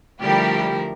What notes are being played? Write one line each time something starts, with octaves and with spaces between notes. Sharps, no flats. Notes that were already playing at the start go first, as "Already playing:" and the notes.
D3 F3 G3 A3 E4 G4 A#4